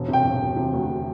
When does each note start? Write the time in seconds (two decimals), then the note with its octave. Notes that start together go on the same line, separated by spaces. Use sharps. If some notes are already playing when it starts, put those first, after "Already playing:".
Already playing: E1
0.08 C3
0.13 G5
0.24 E1
0.41 E1
0.56 C3
0.73 D2